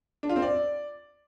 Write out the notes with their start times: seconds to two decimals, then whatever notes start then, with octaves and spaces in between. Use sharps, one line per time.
0.23 D4
0.29 F4
0.36 C4
0.42 D5